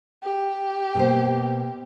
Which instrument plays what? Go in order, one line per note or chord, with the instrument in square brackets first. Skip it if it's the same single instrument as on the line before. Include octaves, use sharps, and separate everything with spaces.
[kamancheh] G4
[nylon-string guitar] B2 A#3 C5